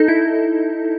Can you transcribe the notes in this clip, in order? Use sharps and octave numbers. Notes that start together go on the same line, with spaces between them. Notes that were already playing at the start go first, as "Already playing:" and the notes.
Already playing: D#4 A4
E4